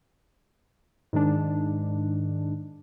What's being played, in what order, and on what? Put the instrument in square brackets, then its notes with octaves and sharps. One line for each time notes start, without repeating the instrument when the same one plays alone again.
[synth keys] G#2 D#3 G#3 D4